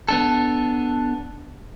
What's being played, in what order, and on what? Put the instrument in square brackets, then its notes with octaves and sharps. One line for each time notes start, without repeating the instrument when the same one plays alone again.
[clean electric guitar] B3 D4 A4